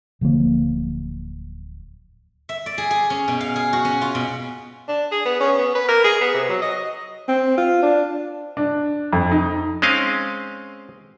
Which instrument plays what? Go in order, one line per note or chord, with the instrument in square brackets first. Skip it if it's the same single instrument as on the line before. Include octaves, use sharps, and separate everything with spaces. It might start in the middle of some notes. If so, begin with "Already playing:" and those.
[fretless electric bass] D1 D3 F3 A#3
[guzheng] E5
D5
G#4
G#4
C#4
B2
F5
G#4
F#4
C#4
F4
B2
[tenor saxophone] D4
G#4
B3
C#4
B3
B4
A#4
G#4
B3
C3
F#3
D#5
[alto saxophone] C4
F4
D4
[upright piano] D4
F2
D#4
[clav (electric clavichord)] G#3 C4 C#4 D#5 F5